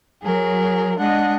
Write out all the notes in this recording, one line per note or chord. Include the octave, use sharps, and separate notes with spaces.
F#3 G#4 A#4
G#3 D4 D#5 F#5